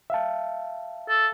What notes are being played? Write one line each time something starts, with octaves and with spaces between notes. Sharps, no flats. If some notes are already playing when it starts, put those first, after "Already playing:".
E5 F5 A5
A4